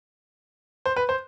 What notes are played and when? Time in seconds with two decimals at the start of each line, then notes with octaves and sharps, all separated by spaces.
0.86 C5
0.96 B4
1.09 C5